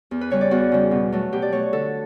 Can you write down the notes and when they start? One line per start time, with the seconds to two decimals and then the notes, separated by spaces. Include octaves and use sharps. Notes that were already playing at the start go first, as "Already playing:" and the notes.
0.11 E2
0.21 B4
0.31 C#3 G3 C#5
0.41 D5
0.51 E2 F#4
0.72 C#3 G3
0.91 B2
1.12 F#3 A3
1.32 B2 G4
1.42 D5
1.52 F#3 A3 C#5
1.73 D3 A4